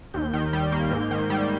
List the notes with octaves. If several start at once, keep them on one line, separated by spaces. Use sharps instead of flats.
D#2 G6
D#3
G3
A#3
G#2
D#3
G3